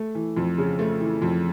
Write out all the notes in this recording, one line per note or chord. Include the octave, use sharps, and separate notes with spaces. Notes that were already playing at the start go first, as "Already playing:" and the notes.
Already playing: A3
E3
F2
C#3
A3
E3
F2